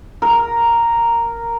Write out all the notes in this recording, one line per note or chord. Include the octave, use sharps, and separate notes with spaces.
A#4